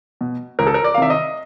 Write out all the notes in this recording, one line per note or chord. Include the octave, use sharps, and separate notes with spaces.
B2
C#2 A#4
A4
A#4
D5
F5
C3 D#3 E5
D#5